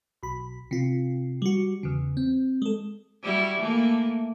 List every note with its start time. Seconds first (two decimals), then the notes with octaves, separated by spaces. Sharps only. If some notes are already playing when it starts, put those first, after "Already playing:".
0.23 B1 B5
0.71 C3 F4
1.42 G3 F#4
1.83 E2 C#3
2.17 C4
2.62 G#3 A4
3.22 G3 E4 F#4
3.60 E3 A3 A#3